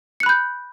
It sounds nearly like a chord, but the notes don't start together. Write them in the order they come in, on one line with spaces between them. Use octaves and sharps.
C#7 F#6 B5 G6